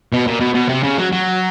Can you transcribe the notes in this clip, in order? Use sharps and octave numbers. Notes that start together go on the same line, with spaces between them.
B2
A#2
B2
B2
C3
C#3
F#3
F#3